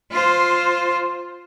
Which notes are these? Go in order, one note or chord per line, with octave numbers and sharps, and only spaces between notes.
F4 C5